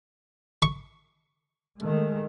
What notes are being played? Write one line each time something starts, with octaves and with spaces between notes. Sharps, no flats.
C#6
D#3 G#3 A3